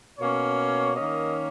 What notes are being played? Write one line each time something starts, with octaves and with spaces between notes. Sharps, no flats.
B2 A#3 C#4 C#5
D#3 A#3 C#4 D#5